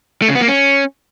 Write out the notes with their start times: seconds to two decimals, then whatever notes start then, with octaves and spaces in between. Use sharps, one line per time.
0.22 A3
0.29 C#3
0.35 B3
0.42 A#3
0.48 C#4